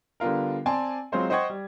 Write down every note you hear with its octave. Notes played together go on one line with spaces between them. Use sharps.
D3 G3 B3 F4 A#4
C4 D5 G#5 A5 C6
F#3 G#3 C4 F4 C5 C#5
C5 D#5 F#5 G5 C#6 G#6
G3